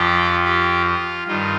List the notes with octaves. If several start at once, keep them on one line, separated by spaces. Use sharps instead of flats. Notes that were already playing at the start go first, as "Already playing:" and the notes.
Already playing: F2 F3 G4
G4
F4
G2 D#3 F4